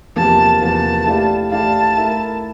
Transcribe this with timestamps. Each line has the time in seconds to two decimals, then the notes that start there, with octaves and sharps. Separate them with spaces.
0.16 E2 C3 F3 A#3 A5
0.61 E2 C3 F3 A#3 A5
1.06 A3 E4 G4 D5 F5
1.51 A3 E4 G4 D5 F5 A5
1.97 A3 E4 A#4 E5